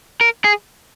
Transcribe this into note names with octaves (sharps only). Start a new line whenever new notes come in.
A#4
G#4